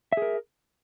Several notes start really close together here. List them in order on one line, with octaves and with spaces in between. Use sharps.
E5 G#4 A#4